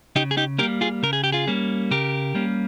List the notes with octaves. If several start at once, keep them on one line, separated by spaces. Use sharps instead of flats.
C#3 D#4 G4
G#4
D#4 G4
G3 A#3 C#4 G4 A#4
F4 G#4
C#3 A#4
G#4
G4
F4 G#4
G3 A#3 C#4
C#3 G4 A#4
G3 A#3 C#4